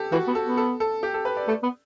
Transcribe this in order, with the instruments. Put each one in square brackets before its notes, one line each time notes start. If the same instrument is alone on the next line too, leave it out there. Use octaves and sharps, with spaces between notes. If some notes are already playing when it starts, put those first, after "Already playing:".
Already playing: [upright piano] G4 A4
[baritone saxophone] E3 [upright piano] F#4
[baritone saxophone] B3
[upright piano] A4
[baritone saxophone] B3
[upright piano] A4
A4
G4
A4
B4
D5
[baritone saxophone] A3
B3